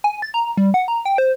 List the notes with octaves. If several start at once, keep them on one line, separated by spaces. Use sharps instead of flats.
G#5
A6
A#5
G3
F#5
A#5
G5
C5